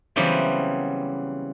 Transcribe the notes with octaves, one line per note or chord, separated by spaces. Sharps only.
C#3 E3 F#3 G3 B3 C4